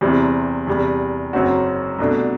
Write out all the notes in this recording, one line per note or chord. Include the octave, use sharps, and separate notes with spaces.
E2 C3 G3 C4 E4
E2 C3 G3
F#1 F#2 F#3 C4 F#4
C2 B2 A3 D4